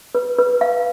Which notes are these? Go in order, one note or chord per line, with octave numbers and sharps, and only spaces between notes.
B4
B4
F5